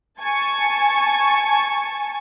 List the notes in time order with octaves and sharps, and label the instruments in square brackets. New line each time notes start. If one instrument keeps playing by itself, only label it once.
[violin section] G#5 A5 C#6